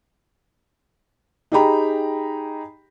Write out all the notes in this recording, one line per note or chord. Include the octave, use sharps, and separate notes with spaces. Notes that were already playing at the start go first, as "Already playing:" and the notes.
D#4 G4 G#4 G5 A#5 B5